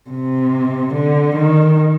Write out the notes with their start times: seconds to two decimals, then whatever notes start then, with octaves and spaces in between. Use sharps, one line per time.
0.10 C3
0.93 D3
1.35 D#3